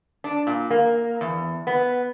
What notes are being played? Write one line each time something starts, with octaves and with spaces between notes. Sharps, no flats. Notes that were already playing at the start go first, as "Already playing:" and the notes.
D4
A#2
A#3
E2
B3